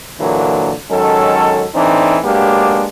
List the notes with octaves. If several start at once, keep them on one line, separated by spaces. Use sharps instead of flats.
A#2 D3 E3 F#3 A#3
D#3 F#3 G#3 C#4 A4
A2 E3 C4 D4 D#4
F#3 G#3 A#3 B3 D4 G4